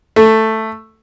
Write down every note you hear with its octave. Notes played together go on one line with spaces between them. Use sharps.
A3